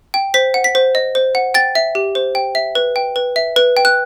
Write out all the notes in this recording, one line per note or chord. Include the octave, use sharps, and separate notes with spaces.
G5
C5 B6
F#5
B6
C5
D#5
C5
F#5
G5 A6
E5
G4
C5
G5
E5
B4
G5
B4
E5
B4
G5
F#6